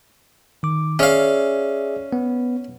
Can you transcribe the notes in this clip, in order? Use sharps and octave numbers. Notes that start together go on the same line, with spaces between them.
D#3 D6
C#4 G#4 D5 E5 F5
B3